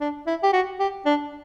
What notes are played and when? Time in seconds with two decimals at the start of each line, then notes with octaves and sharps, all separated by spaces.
0.01 D4
0.27 E4
0.43 G4
0.53 F#4
0.80 G4
1.06 D4